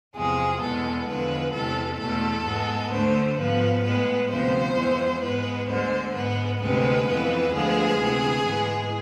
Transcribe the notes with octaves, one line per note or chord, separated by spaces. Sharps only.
E2 C3 F3 G#3 G#4
E2 B2 G#3 B3 A4
E2 D3 F3 G#3 B3 B4
E2 C3 E3 G#3 A4
E2 B2 A3 A4
G#2 G#3 B3
D2 D3 A3 C5
G#2 F3 B3 B4
A2 G#3 B3 B4
D2 C3 F3 B3 C5
F2 E3 G#3 B3
G#2 G#3 B3 B4
D2 D3 G#3 C5
G#2 G#3 B3 B4
D2 C3 G#3 B3 B4
F2 E3 G#3 B3
D2 D3 F3 G#3 B3 G#4
D2 C3 E3 B3
G#2 E3 G#3 B3